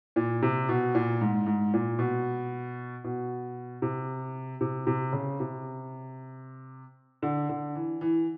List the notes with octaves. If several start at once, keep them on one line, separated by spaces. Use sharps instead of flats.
A#2
C3
B2
A#2
G#2
G#2
A#2
B2
B2
C3
C3
C3
C#3
C3
D3
D3
E3
E3